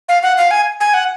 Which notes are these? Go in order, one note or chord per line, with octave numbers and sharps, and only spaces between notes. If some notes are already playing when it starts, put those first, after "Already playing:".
F5
F#5
F5
G#5
G#5
F#5